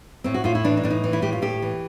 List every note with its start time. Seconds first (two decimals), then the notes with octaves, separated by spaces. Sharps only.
0.24 A2 C4
0.34 F#4
0.44 A2 F4
0.55 E4
0.64 E3 D4
0.77 D#4
0.83 A2 D4
0.90 D#4
1.04 E3
1.13 E4
1.22 A2 G4
1.32 F4
1.42 A2 G4
1.62 E3